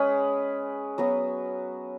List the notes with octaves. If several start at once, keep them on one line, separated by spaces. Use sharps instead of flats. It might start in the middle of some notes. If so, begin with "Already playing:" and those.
Already playing: G#3 C#4 G#4 B4
F#3 B3 F#4 B4